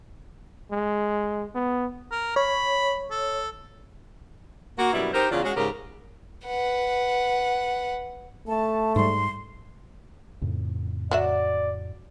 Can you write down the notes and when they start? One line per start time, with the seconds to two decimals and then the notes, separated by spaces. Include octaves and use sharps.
0.71 G#3
1.55 B3
2.12 A#4
2.36 C#5 B5
3.11 A4
4.79 A#3 F#4
4.93 F#2 B2 G3 E4
5.13 D#4 G4 A#4 C5
5.31 E2 C#3 D4 F4
5.43 G#3 C#4 F#4
5.57 G#2 C#3 G4 A#4
6.46 B4 F#5
8.48 A3 A5
8.96 G#2 G3 C6
10.41 F2 A2 C#3
11.11 F#3 F#4 D5 E5